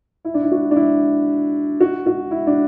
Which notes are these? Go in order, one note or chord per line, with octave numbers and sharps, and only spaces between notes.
E4
D4
E4
F#4
D4
E4
F#4
F#4
E4
D4